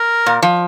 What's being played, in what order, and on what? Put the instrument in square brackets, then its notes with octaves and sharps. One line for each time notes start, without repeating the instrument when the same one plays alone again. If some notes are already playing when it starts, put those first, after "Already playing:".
Already playing: [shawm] A#4
[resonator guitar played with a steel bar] A#2
F3